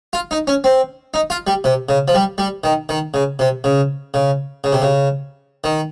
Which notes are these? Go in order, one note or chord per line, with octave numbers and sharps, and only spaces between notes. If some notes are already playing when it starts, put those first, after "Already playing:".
F4
D#4
C#4
C4
D#4
F4
G3
C3
C#3
F3
G3
G3
D#3
D#3
C#3
C3
C#3
C#3
C#3
C3
C#3
D#3